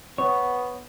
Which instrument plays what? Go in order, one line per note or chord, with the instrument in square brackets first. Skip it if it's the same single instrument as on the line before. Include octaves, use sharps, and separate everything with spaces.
[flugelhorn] B3 [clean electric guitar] C#5